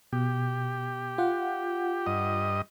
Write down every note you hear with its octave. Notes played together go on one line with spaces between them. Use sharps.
B2 G4
F4 F#5
G2 D#5